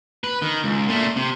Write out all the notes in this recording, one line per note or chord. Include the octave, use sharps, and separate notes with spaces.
B4
D#3
C#2
A#2 A3
C3